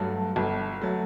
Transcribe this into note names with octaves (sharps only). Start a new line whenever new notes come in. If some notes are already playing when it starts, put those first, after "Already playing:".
Already playing: G2 F#3 A3
G1
F#3 A3